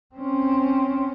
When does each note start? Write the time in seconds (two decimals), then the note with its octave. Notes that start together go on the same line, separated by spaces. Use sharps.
0.15 C4 C#4